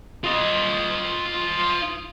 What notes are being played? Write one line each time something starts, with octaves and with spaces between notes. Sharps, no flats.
F4 D#5